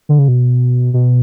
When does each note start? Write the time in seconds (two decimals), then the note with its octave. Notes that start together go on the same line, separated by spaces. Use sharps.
0.09 D3
0.19 C#3
0.28 B2
0.94 B2